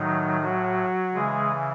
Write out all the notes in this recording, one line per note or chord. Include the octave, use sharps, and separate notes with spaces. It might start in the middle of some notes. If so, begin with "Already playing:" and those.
Already playing: A2 D#3 F#3 D#4
F#3 F#4
C#3 E3 G#3 G#4